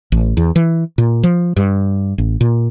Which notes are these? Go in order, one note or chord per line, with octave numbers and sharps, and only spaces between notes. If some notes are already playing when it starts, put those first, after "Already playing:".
A1
E2
E3
A#2
F3
G2
A1
A#2